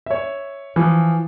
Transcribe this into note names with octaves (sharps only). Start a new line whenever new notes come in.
C#5 E5
E3 F3